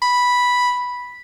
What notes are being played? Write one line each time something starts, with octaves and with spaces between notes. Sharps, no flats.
B5